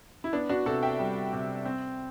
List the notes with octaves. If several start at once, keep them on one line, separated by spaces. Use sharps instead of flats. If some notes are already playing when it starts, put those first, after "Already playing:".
E4
B3 D4
D4 F#4
C3 F#4 A4
E5 G5
G3
C3
C4